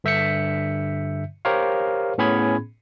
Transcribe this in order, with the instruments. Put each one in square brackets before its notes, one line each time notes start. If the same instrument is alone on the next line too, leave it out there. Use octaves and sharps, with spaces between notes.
[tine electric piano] G2 D3 E5 G6 B6 C#7
G4 A#4 C5 C#5 F5
A2 B3 C#4 G#4 B5 G#6